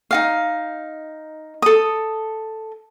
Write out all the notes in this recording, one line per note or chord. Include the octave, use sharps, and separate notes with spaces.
D#4 F#4 F5
A4 D#6